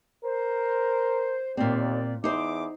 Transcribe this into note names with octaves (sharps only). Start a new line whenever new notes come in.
A#4 C5
D#2 A#2 C4 D5
E2 D#4 C5 D6